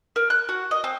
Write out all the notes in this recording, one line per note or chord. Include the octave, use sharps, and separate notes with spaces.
A#4
F#6
F#4
D#5
C4